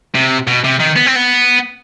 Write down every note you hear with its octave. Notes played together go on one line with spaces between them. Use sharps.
C3
B2
C3
D#3
B3
C4
B3